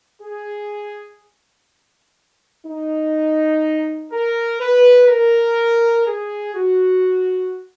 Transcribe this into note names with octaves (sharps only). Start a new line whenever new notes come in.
G#4
D#4
A#4
B4
A#4
G#4
F#4